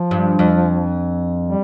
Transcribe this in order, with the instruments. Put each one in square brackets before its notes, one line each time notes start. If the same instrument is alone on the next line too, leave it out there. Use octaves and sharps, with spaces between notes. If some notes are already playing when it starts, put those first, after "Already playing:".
Already playing: [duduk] F3
[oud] G2
F2
[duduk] G3